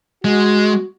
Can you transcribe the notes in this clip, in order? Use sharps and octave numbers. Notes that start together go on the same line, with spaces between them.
G#3 F#4